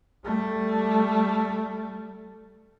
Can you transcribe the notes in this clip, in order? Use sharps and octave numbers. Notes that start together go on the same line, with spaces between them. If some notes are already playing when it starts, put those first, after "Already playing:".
G3 A3